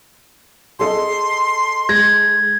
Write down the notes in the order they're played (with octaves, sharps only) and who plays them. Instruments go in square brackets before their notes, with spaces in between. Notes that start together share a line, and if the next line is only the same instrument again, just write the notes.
[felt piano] G#4 A4 D#5 [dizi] C6
[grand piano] G#3 A#6 [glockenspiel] G#6